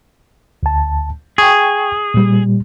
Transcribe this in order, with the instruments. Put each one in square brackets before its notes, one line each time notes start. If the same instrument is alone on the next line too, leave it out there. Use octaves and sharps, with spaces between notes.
[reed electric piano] D2 A5
[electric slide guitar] G#4 [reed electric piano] G5 C#6
[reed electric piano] A#2 G3